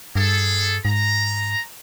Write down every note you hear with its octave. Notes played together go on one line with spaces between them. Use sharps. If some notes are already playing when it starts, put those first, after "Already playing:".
G2 G#4 A4
G#2 A#5